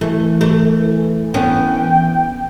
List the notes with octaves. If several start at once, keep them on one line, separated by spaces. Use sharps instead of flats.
E3 A3
A3
B3 C#4 G5